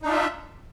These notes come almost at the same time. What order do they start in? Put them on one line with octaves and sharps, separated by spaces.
D#4 D4 F4 E5